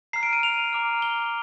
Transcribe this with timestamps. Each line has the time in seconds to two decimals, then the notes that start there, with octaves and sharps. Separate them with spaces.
0.13 A#5 F6 C7
0.23 D7
0.33 D#7
0.43 F7
0.73 A#5 D6 F6
1.02 G7